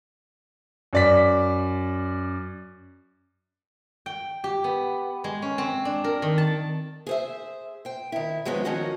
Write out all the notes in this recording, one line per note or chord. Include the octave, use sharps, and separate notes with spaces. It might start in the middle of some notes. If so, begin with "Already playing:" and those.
F#2 D5 B6
G5
G4
B3
G#3
C#4
C4
D4
A#4
D#3
A5
G#4 C5 E5
C5 G5
D#3 E4
F3 F#3 G#3 B3 C#4
D#3 F3 C#4 D#4 F#4 A#4